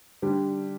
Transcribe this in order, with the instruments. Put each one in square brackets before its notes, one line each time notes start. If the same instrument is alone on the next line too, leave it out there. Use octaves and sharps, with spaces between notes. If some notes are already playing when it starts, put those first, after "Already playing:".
[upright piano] D3 G3 D4 G4